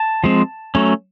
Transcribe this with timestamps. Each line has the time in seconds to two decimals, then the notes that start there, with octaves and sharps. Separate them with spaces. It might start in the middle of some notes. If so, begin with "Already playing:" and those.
Already playing: A5
0.24 F3 G#3 C4
0.75 F#3 A3 C#4